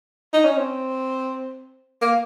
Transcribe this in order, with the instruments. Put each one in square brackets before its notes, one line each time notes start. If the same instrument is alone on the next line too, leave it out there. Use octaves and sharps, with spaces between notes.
[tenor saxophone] D#4
C#4
C4
A#3